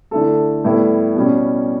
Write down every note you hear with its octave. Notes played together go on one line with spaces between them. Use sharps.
D3 A3 E4 A4
A2 G3 B3 E4
B2 G3 C#4